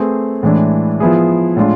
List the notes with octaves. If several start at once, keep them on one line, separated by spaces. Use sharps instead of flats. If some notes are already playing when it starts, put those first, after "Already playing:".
Already playing: A3 C4 G#4 B4
A2 E3 G#3 D4
F3 B3 E4 G#4
A2 G#3 D4 F4